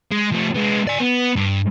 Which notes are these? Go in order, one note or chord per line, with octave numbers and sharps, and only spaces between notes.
G#3
F3 A3
G#3 B3
D5 G#5
B3
G2